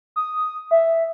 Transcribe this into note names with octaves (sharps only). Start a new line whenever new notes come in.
D#6
E5